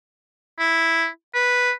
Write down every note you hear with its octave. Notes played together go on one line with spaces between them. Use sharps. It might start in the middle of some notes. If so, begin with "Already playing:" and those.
E4
B4